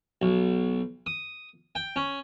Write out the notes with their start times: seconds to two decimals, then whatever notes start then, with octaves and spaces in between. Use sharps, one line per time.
0.22 B1
1.06 D#6
1.75 G5
1.96 C#4